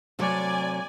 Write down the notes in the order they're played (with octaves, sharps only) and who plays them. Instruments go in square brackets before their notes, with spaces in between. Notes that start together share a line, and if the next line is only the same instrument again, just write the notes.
[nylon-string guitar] C3 F#3 A3 [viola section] D5 G#5